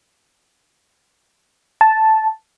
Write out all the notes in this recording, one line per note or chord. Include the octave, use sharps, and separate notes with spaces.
A5